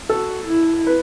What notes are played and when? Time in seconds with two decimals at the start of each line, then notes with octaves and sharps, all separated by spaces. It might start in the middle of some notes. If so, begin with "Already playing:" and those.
0.09 F#4 A4
0.48 E4
0.87 B4